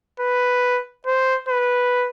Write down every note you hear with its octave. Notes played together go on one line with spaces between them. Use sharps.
B4
C5
B4